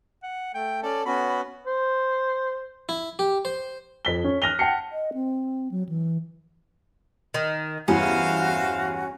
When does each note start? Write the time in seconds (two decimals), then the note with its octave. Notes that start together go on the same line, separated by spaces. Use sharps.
0.23 F#5
0.55 A3 G5
0.83 C#4 A4 D5
1.06 B3 C#4 F#4 B5
1.30 B5
1.67 C5
2.89 E4
3.19 G4
3.45 C5
4.05 F2 B6 G7
4.24 C#4
4.42 F6 F#6 A#6 D#7 F7 G7
4.59 F#5 G5 A5 C7 C#7
4.92 D#5
5.14 C4
5.71 F#3
5.89 E3
7.34 D#3
7.88 E2 G2 E3 C#4 F#4 C5 E5 F5